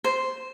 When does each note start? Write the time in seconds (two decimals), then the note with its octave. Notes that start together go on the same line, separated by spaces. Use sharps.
0.04 C5